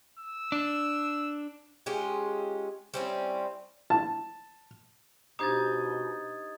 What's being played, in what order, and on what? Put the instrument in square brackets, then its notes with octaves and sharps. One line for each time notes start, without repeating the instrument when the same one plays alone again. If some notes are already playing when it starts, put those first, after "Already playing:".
[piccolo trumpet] E6
[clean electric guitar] D4
[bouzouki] G#3 C#4 F4 G4
G3 C4 C#4 E4
[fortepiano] A5
[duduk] B2 [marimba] D4 G4 C5 [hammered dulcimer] D#4 [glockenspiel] D#6 G#6 A6